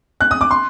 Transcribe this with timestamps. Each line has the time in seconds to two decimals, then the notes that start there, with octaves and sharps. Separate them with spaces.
0.21 F#6
0.31 D#6
0.41 D6
0.51 C6